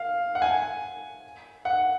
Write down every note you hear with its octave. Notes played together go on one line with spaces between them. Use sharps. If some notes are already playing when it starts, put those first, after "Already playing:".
Already playing: F5
F#5
G#5
F#5